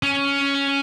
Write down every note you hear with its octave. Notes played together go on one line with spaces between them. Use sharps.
C#4